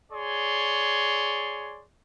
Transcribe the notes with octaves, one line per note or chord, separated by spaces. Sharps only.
G#4 C#5 D5 C6